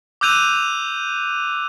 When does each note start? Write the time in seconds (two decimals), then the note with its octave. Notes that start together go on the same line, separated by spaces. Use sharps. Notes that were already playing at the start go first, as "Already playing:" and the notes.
0.21 D6 E6 F#6 G6 D#7 F7